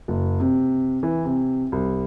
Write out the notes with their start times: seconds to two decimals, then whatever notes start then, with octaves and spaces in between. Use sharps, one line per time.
0.08 F#1
0.40 C3
1.03 E3
1.25 C3
1.72 C2